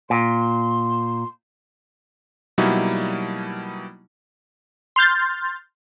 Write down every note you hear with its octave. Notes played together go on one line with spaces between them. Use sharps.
A#2 C6
B2 F#3 G3 A#3 D#4 E4
C6 F6 G6 A6